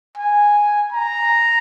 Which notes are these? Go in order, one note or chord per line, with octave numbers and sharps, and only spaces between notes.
G#5
A#5